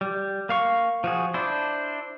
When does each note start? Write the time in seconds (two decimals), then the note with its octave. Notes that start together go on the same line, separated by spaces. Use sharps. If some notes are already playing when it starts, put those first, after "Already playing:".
0.01 G3
0.49 A#3 F5 C#6
1.04 F3 F#4 G#4
1.34 D4 E4 C5